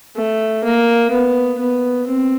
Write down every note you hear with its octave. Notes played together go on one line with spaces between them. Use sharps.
A3
A#3
B3
B3
C4